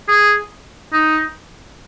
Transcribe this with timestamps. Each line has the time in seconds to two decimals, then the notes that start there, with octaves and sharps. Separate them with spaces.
0.08 G#4
0.93 D#4